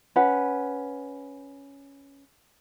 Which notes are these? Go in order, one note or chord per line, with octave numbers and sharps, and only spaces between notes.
C#4 B4 F#5